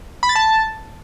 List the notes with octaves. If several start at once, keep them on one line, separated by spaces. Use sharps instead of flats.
B5
A6
A5